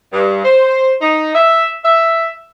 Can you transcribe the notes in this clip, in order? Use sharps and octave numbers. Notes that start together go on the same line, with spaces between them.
G2
C5
D#4
E5
E5